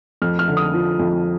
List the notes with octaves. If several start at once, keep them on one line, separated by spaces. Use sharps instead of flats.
F2 F6
F6
D3
D#6
F3
F2